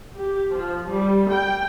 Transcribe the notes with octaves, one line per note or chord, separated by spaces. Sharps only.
G4
F3
G3
G5